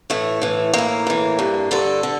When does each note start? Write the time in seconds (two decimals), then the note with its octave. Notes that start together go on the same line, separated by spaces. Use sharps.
0.10 A2 E3 A3
0.41 A2 E3
0.73 A2 E3 A#3
1.07 A2 E3
1.39 G2 D3
1.71 G2 D3 A4
2.03 D3